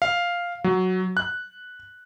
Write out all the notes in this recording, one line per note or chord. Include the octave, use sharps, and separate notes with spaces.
F5
F#3
F#6